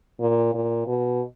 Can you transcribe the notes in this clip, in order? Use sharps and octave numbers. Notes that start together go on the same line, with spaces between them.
A#2
A#2
B2